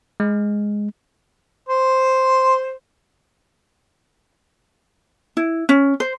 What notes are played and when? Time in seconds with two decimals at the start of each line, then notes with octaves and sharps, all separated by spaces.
0.20 G#3
1.69 C5 C6
5.37 E4
5.69 C#4
6.00 C5